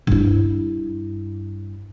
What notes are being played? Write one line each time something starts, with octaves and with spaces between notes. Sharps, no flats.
G2 E4